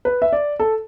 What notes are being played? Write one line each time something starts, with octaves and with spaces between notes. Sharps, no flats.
B4
E5
D5
A4